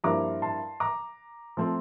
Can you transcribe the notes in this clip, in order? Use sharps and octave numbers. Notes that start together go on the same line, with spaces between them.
G2 F3 A#3 E4 A#5 D6
A5 C6
A#5 D6
F3 A3 C4